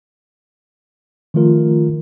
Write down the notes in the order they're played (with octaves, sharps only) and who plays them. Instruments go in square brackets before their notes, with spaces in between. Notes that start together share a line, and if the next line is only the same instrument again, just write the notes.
[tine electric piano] D#3 F3 A3 F4 A#4